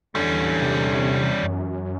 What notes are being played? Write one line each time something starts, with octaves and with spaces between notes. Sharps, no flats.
E2 D3 G3 C#4
C3
F#2